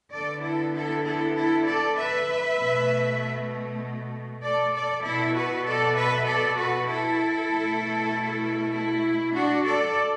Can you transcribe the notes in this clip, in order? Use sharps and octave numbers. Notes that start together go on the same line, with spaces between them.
D3 B3 A4 D5
E4 A4
E4 A4
E4 A4
E4 A4
A4 D5
B4 E5
B2 A3
A4 D5
A4 D5
B2 B3 E4 A4
F#4 B4
A4 D5
B4 E5
A4 D5
F#4 B4
E4 A4
B2 A3
E4
D4 F#4
A4 D5